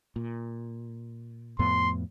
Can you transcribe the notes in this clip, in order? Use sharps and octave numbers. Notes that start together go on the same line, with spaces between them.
A#2
F2 A2 B3 C6